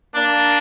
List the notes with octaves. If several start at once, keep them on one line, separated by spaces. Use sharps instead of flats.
A#3 D4